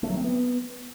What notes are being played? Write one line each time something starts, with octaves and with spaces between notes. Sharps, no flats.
A3
F#3
C4
B3